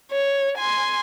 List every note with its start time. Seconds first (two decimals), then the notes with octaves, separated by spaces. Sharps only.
0.12 C#5
0.58 G#5 C6